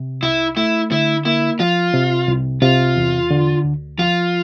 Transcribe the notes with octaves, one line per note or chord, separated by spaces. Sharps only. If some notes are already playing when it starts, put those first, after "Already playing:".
Already playing: C3
C2 E4
A3 E4
D3 E4
A#3 E4
F3 F4
C3
C2
C3 F4
E2
D3
D2
F3 F4